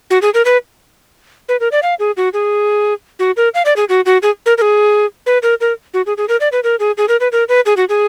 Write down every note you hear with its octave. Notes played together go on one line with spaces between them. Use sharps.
F#4
G#4
A#4
B4
B4
A#4
D5
F5
G#4
F#4
G#4
F#4
A#4
F5
D5
G#4
F#4
F#4
G#4
A#4
A#4
G#4
B4
A#4
A#4
F#4
G#4
G#4
A#4
D5
B4
A#4
G#4
G#4
A#4
B4
A#4
B4
G#4
F#4
G#4